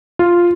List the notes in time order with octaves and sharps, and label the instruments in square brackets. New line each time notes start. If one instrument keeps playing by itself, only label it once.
[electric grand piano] F4